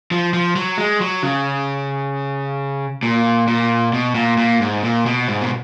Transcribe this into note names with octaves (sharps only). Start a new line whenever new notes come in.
F3
F3
F#3
G#3
F#3
C#3
A#2
A#2
B2
A#2
A#2
G#2
A#2
B2
G#2
B2